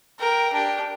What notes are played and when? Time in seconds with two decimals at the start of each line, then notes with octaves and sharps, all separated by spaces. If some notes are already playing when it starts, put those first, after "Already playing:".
0.19 A#4 G5
0.53 D4 G4